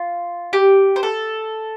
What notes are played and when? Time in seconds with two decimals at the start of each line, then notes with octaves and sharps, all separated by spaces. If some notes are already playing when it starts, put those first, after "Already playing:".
Already playing: F4
0.53 G4
0.96 C5
1.03 A4